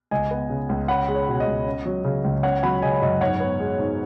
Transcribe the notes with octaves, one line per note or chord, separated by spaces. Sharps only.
C#2 D#5 G#5
B3
C#3
C#2
C#4 F#5 B5
G#3
C#5
B2
D#5
C#2
C#4
F#3
C#3
C#2
C#4 C#5 F#5
F#3 F#5 B5
C#3 D#5 G#5
F#2 D#5
G#2 C#5 F#5
B3
G#3
G#2